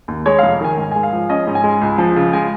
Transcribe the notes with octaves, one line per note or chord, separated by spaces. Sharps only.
D#2
G#3 C#5
F1 F5
D#3 G#5
G#2 G#5
G#3 G#5
F5
F3
C#4 D#5
G#2
G#5
G#3
C#2
F3
C#3
G#3 G#5